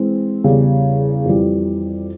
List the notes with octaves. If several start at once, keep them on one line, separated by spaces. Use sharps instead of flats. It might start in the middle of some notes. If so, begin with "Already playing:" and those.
Already playing: E3 G#3 C4
E2 C#3 G3
F2 E3 G3